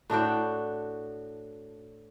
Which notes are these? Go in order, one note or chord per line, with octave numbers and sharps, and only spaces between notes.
A2 D4 F#4 G5